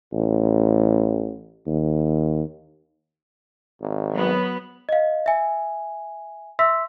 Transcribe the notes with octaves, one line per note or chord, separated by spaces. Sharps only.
A1
D#2
G#1
F#3 B3
D#5 F5
E5 G#5
E5 C6 E6 B6